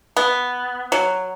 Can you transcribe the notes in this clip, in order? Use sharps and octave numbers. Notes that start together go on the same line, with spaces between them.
B3
F#3